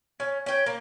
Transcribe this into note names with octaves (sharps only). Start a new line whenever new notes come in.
C#4
C#4 G5
A#3